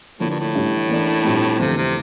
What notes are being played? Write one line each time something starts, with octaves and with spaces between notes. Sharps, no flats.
A2 D3 F3 A#3 D4 F4
G2
A2
A1 G2 E3 G3
E3 A#3 D4 A4 D5
A#1 A#2 G3 C4
G1 F2 C3 E3 A3
C3